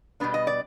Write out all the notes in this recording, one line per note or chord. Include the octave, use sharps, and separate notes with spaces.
B2 G3 B3 D4
D#5
D5